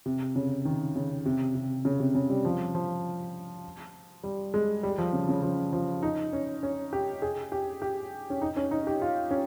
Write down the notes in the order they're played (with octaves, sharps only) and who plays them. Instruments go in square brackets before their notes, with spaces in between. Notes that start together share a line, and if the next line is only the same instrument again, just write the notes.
[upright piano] C3
C#3
D#3
C#3
C3
C3
C#3
C3
C#3
G3
F3
F3
G3
G#3
G3
F3
C#3
C#3
F3
F3
D#4
C#4
C#4
G4
G#4
G4
G4
C#4
D#4
C#4
D#4
G4
F4
C#4